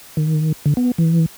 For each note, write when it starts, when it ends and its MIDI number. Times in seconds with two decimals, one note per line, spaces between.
0.17 0.52 51
0.66 0.74 50
0.77 0.91 59
0.98 1.26 52